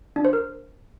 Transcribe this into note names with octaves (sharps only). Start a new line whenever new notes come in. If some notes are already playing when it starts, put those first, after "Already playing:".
D4
C5
A#4